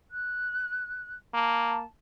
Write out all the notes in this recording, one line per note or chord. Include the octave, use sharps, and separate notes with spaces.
F#6
A#3 A5